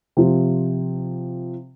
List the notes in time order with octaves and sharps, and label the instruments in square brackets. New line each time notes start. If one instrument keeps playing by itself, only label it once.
[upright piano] C3 F3